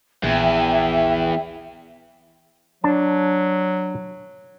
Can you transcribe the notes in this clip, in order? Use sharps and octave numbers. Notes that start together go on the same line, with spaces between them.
A#1 E2 E5 G5
F#3 D4 A5